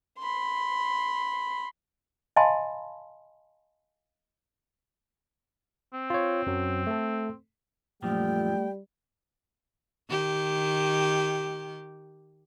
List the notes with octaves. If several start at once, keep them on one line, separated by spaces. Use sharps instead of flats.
B5 C6
D#5 F5 G#5 A5 B5 C6
C4
F4 C#5
F#2 F#3
A3 A4
F#2 A#2 F3 G3 A3 G5
D#3 G4